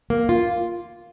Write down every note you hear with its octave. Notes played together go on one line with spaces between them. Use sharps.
A#3
F4